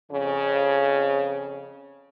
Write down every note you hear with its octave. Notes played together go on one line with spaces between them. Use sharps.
F2 C#3